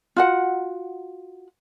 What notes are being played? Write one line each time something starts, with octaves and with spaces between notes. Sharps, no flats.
F4 F#4 F#5